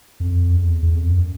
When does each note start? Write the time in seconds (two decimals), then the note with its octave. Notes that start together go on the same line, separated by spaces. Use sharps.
0.20 F2
0.56 E2
0.82 E2
0.93 F2
1.11 F#2